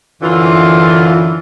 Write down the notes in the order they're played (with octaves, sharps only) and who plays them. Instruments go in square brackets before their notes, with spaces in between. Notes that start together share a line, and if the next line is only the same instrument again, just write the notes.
[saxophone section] F#2 D3 E3 [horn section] F4